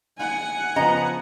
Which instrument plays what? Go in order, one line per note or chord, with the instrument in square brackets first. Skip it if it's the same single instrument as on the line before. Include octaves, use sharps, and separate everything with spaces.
[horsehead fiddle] F#5 G#5
[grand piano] C#3 F3 B3 [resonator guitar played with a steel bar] D#5 A#5